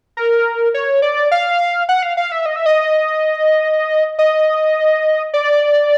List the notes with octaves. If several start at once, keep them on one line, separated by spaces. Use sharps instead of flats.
A#4
C#5
D5
F5
F#5
F5
F5
E5
D#5
E5
D#5
D#5
D5